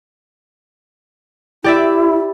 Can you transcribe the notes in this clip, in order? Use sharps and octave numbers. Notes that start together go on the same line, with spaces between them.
E4 G4 D5 E5